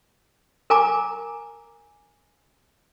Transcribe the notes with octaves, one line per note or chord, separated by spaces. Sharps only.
A#4 G#5 A#5 D6